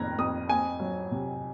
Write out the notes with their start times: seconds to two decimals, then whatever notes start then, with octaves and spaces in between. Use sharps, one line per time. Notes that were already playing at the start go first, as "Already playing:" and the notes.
Already playing: F2 D#3 A#3 A#5 F#6 G#6 A#6
0.18 F2 D#6
0.49 C4 G#5
0.80 F#3
1.11 C3